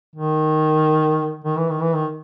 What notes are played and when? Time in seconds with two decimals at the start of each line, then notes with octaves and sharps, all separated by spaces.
0.16 D#3
1.45 D#3
1.57 E3
1.70 D#3
1.82 E3
1.94 D#3